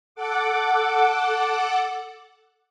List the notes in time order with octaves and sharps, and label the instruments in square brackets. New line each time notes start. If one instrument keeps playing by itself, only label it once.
[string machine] A4 F#5 D6